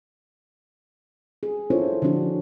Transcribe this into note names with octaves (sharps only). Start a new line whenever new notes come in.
G#4
D4 E4 F4 A4 C5 C#5
D3 F3 C#4 D4 F#4